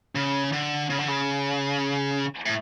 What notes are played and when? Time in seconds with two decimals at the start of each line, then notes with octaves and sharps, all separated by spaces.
0.15 C#3
0.53 D3
0.90 C#3
0.98 D3
1.08 C#3
2.45 A2